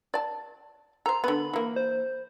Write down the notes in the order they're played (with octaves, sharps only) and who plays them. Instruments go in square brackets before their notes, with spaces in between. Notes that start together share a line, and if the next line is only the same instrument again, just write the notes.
[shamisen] D5 A5
[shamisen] A4 C5 [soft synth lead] A#5
[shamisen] D3 B3 [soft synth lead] B5
[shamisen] E3 A#3
[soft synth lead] C5